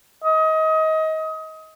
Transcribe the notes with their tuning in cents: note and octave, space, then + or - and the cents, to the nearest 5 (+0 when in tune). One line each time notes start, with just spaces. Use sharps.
D#5 +25